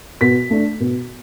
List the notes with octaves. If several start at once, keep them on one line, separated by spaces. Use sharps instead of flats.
B2 B6
A3 D4
B2